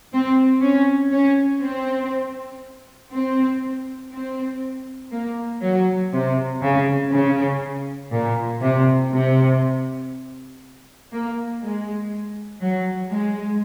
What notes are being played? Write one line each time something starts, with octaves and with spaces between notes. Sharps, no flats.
C4
C#4
C#4
C4
C4
C4
A#3
F#3
C3
C#3
C#3
A#2
C3
C3
A#3
G#3
F#3
G#3